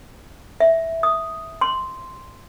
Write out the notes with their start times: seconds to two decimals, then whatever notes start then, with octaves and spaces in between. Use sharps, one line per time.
0.60 E5
1.03 D#6
1.61 C6